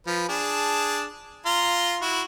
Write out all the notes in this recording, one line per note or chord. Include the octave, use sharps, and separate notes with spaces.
F3 B4
D4 G#4 A5
F4 A#5 C6
E4 F#4